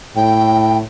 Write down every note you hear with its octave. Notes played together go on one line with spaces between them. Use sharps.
A2 G5